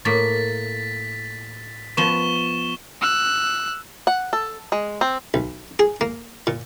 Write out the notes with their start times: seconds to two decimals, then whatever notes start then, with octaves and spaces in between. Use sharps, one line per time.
0.05 A2 A#3 A6 B6
1.97 F3 B3 C#6 E7 G7
3.01 E6 F#6
4.07 F#5
4.33 A4
4.72 G#3
5.01 C4
5.34 B1
5.79 G#4
6.01 A#3
6.47 A#2